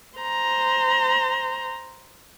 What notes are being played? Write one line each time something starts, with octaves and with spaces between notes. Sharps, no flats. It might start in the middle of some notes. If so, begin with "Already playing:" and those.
C5 A#5